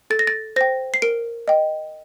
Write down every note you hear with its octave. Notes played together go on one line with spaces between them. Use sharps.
A4 A6
A#6
A6
C5 G5 A#6
C7
A#4 D7
D#5 G5